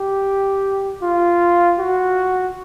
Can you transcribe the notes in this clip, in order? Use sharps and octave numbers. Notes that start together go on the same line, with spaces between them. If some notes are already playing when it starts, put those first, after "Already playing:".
Already playing: G4
F4
F#4